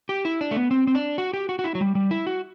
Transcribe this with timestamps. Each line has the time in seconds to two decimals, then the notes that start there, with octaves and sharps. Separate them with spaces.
0.09 G4
0.25 E4
0.41 D4
0.51 A3
0.56 B3
0.71 C4
0.87 C4
0.95 D4
1.18 F#4
1.33 G4
1.49 F#4
1.59 F#4
1.64 E4
1.75 F#3
1.81 G3
1.95 G3
2.11 E4
2.27 F#4